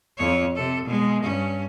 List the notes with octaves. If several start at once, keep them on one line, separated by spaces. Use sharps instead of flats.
F2 C#5
C3 A4
B2 G#3
G2 C#4